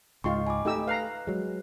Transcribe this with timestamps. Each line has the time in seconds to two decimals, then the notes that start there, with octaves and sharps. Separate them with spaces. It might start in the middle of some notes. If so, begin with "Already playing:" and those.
0.24 C#2 G#2 F4 D#5 G5 C6 C#6
0.47 G#5 B5 D6
0.65 A3 D#4 G4 E6
0.88 B4 F5 A#5 F#6
1.27 F#3 G#3